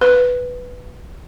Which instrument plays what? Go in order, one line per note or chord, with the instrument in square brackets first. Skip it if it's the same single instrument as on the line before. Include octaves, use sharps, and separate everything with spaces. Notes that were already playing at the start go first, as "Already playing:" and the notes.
[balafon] B4